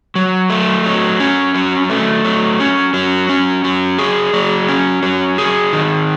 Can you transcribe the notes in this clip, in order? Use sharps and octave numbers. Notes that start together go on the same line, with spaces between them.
F#3
A3
F#3
C#4
F#3
A3
F#3
C#4
F#3
C#4
F#3
G#4
F#3
C#4
F#3
G#4
D#3